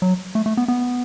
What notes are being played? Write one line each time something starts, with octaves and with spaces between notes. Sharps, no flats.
F#3
A3
A3
B3
B3